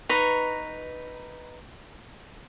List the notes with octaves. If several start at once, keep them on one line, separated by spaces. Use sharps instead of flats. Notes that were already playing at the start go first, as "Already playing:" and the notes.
D#4 B4 A#5 C#6